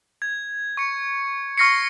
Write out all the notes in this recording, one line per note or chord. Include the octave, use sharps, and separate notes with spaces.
G#6
C#6 C#7
C#6 F6 A#6 C7 C#7